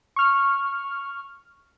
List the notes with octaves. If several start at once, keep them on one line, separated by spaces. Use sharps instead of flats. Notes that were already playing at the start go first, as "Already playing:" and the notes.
C#6 F6